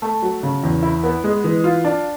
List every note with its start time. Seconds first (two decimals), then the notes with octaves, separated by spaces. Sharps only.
0.02 A3
0.22 F#3
0.43 C#3
0.63 E2
0.83 E4
1.03 B3
1.24 G#3
1.44 E3
1.64 F4
1.84 D4